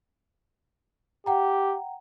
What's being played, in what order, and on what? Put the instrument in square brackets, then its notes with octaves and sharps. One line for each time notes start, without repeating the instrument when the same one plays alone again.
[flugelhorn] G4 [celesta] F#5 G5 A#5